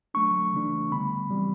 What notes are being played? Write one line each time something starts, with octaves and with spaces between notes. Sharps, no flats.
F#3 A3 D4 C#6
C#3 E3 A3 D4
D3 G3 B3 B5
C#3 E3 G3 C4